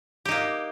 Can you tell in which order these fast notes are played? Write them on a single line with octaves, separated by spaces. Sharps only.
G4 D#4 A#3